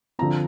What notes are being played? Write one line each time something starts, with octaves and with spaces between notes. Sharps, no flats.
D3 F3 C4 A#5